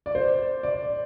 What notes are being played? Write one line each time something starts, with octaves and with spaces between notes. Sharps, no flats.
D5
C5
D5